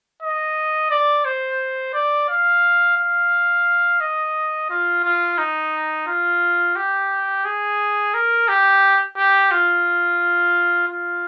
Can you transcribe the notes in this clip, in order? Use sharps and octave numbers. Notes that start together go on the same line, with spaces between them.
D#5
D5
C5
D5
F5
F5
D#5
F4
F4
D#4
F4
G4
G#4
A#4
G4
G4
F4
F4